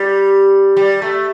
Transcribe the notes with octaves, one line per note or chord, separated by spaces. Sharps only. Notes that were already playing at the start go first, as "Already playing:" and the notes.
Already playing: G3
G3
A3